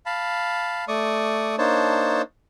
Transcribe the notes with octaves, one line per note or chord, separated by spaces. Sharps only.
F5 A5 B5
A3 D5 C#6 D#6
A#3 D4 D#4 C5 C#5 A5